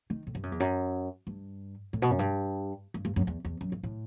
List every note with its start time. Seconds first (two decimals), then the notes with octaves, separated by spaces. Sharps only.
0.10 D#3
0.27 A2
0.35 G2
0.43 F#2
0.52 E2
0.60 F#2
1.27 G2
1.93 A2
2.02 B2
2.11 F#2
2.19 G2
2.94 G2
3.05 G2
3.16 F#2
3.27 E2
3.45 E2
3.61 F#2
3.72 G2
3.83 A2